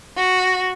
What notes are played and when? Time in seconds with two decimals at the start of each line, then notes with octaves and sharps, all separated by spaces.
0.16 F#4